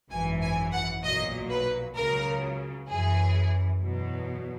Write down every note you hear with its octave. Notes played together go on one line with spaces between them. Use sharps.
G#1 F#2 E3 G#5
G#5
F#5
B1 A#2 F#3 D#5
B4
C#2 C#3 F#3 A#4
F#2 E3 G#4
E2 B2 F#3